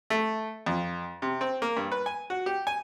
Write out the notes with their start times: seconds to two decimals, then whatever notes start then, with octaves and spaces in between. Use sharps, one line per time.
0.10 A3
0.66 F2
1.22 C3
1.41 C4
1.62 A#3
1.77 G2
1.92 B4
2.06 G#5
2.30 F#4
2.46 G4
2.67 G#5